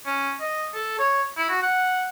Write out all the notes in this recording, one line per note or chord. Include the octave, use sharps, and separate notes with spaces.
C#4
D#5
A4
C#5
E4
F#4
F#5